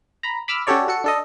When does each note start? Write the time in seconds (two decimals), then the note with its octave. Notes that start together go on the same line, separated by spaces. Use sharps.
0.23 A#5 B5
0.48 B5 D6 E6 F6
0.67 C#4 F#4 G4 A4 C#5 D5
0.88 F#4 A4 C#7
1.04 D4 A4 D#5